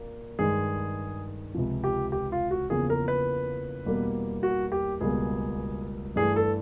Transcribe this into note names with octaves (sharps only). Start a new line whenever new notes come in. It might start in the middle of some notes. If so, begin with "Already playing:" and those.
Already playing: A#2 A#3
G2 D#3 G#3 G#4
C#2 C3 F3
G4
G4
F4
F#4
E2 C#3 F3 A#3 G#4
A#4
B4
E2 B2 G3 A#3
F#4
G4
C#2 B2 G3 A#3 G#4
G2 E3 A3 G#4
A4